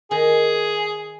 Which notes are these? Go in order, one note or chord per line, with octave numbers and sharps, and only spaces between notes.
D#3 G#4